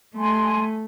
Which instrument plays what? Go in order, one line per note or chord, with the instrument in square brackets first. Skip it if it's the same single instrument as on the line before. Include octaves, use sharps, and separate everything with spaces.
[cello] A3 [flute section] G#5 C6